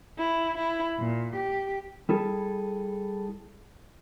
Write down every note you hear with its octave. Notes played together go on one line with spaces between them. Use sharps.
E4
E4
A#2
G4
G3 E4 G#4 A4